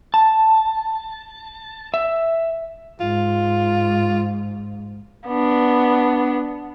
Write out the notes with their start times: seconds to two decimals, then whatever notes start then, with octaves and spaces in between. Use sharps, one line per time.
0.14 A5
1.94 E5
3.00 G#2 F4
5.27 B3 D4